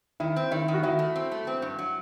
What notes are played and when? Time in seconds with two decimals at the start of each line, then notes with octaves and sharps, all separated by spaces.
0.20 D#3 E4
0.36 C4
0.51 D#3 E4
0.68 D#3
0.74 F#4
0.83 D#3 E4
0.99 A3
1.16 C4
1.32 A3
1.47 C4
1.62 G2
1.78 F#3